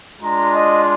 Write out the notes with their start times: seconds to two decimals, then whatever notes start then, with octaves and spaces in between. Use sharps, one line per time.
0.21 G#3 D4 F4 A#5
0.53 D#5